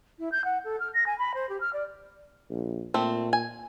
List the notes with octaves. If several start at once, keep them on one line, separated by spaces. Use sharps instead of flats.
E4
G6
F#5
A4
F6
A#6
G#5
B5
C5
G4
F6
D5
A#1
A#2 A3 C4
G#5